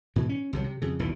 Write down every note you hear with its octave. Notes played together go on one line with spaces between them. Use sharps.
G#2 B2 E3
C#4
C2 C3 F3 F#3
C3
F2 C#3
D#1 B1 A#2 E3